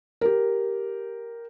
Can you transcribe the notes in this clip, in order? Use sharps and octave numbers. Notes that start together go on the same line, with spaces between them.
G4 A#4